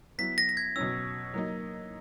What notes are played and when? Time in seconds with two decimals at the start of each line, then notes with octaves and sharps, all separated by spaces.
0.18 F#3 B3 E4 B6
0.38 A#6
0.49 A#6
0.57 G#6
0.76 B2 F#3 C#4 E6
1.34 F#3 A#3 D#4